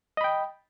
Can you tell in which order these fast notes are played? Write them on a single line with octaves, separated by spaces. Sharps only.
D#5 B5 G5